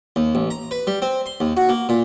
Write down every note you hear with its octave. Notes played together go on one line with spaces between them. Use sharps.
D#2
A1
A#5
B4
G3
C4
C6
D#2
F#4
A#3
A#2